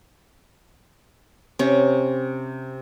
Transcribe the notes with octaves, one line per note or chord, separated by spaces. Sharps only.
C3 C#4